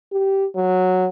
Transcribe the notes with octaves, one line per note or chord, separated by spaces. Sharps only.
G4
F#3